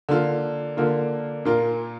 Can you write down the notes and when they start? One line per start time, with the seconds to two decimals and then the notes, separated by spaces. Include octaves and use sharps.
0.09 D3 A#3 F4
0.77 D3 A#3 F4
1.45 A#2 A#3 F4 A#4